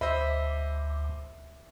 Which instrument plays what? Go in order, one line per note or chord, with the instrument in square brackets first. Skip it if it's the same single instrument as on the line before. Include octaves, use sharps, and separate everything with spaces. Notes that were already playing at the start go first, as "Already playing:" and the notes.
[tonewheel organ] D2 [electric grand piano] C5 D#5 B5 [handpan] E5